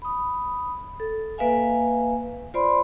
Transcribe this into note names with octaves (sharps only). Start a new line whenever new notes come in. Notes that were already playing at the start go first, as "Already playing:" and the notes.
B5 D#6
A4
A#3 B4 E5 F5 G#5
F4 C5 D5 B5 C6